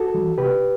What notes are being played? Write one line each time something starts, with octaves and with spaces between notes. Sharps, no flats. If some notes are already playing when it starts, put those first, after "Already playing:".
Already playing: F#4 A4
E3 G3
C3 G4 B4